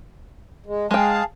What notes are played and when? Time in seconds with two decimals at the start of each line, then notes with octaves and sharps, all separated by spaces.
0.66 G#3
0.91 G#3 G#4 F5 G5 A5